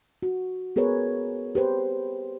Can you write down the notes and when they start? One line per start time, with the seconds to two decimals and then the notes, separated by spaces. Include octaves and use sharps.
0.23 F#4
0.76 B3 G#4 A#4 B4 C#5
1.55 G4 B4 C5